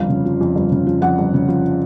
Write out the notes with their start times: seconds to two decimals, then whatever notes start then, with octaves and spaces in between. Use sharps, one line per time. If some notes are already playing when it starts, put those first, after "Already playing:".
Already playing: G1 F2 F5
0.09 C#3
0.25 F3
0.41 F2
0.56 G1
0.72 C#3
0.86 F3
1.02 F2 F#5
1.18 G1
1.34 C#3
1.48 F3